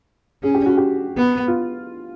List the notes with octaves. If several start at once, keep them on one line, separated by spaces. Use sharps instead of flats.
C#4 G#4
G4
F#4
G4
B3
F4